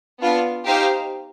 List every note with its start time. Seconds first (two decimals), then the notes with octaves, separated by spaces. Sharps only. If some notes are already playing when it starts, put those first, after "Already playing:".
0.21 B3 D4 F4
0.66 D#4 G4 C5 F5